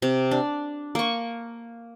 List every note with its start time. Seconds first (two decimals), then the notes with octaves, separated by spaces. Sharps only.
0.02 C3
0.31 D4
0.95 A#3 C#6